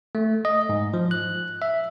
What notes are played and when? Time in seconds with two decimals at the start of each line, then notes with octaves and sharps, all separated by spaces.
0.15 A3
0.45 D#5
0.69 G#2
0.94 F3
1.11 F#6
1.62 E5